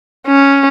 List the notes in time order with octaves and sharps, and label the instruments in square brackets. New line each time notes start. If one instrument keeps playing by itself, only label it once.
[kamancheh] C#4